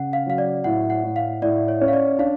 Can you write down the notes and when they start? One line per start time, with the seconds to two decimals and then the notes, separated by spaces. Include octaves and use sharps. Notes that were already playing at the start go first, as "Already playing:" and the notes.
Already playing: C#3 F#5
0.13 F5
0.26 F#3 F5
0.38 D5
0.64 A2 F#5
0.90 F#5
1.04 A2
1.16 F5
1.42 A2 D5
1.68 C#5
1.81 C#4
1.88 F5
1.93 D5
2.19 D4 F5